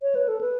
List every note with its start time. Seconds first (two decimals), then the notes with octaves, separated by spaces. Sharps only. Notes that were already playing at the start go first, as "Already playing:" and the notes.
0.02 C#5
0.15 B4
0.28 A4
0.41 B4